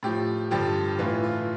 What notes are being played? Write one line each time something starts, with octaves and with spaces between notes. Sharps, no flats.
A2 F3 G4
G2 D3 F3 G4
A2 E3 F4
F4